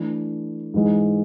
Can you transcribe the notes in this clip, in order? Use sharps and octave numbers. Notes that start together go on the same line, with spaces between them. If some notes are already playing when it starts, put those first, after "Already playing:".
Already playing: E3 A3 D4
G#2 E3 G#3